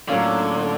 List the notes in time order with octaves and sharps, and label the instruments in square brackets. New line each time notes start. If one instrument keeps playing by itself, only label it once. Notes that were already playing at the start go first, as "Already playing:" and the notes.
[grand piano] A2 F#3 A#3 C#4 F4 [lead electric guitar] D3